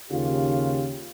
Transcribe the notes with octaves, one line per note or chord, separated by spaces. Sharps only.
D#2 C#3 F4 G4